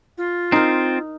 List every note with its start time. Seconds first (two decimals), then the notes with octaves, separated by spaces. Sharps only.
0.17 F4
0.52 C4 D#4 A#4